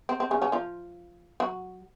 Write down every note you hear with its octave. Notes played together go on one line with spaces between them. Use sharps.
C4
C4
C#3 C#4
C#3 C#4
F3 F4
F#3 F#4